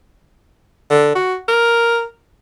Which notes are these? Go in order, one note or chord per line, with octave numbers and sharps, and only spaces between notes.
D3
F#4
A#4